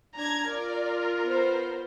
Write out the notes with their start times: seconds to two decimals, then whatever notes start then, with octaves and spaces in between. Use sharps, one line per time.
0.15 D4 A#5 G#6
0.48 F4 A#4 D5
1.24 B3 C5